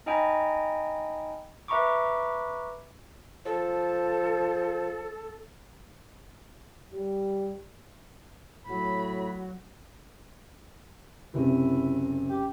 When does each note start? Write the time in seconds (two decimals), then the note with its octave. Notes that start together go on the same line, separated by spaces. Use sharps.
0.06 D#4 D#5 G5 G#5 A#5 B5
1.68 B4 E5 A#5 B5 C#6 D6
3.45 F3 A4
6.93 G3
8.67 A2 F#3 B5
11.34 F#1 C3 E4
12.29 G4